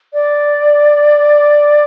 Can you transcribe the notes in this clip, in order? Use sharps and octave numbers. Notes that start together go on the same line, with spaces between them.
D5